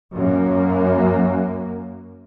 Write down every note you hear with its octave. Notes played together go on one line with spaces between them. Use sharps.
F#2 A#3